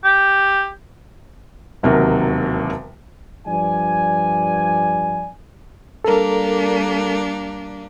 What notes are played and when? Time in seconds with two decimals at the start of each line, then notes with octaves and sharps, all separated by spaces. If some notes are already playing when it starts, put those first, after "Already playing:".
0.05 G4
1.83 E1 D#2 C3 F#3 A#4
3.47 G2 F3 D5 G#5
6.05 G3 A#3 D4 A4 A#4